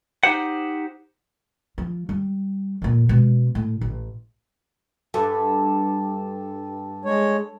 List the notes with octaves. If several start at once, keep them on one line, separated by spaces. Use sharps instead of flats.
D#4 G4 C5 F#5
F3
G3
F2 A#2
B2 G#3
A2
A1
G2 A4
G#3 C#5